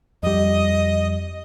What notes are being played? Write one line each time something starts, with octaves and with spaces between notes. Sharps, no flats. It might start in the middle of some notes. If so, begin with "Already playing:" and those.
F2 G3 D#5